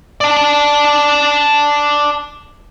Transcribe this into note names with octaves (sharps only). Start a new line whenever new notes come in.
D5 A5